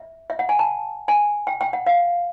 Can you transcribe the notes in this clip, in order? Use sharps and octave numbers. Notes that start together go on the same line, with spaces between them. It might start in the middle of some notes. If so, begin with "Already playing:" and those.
Already playing: E5
E5
F#5
G#5
A5
G#5
G5
G5
F#5
F5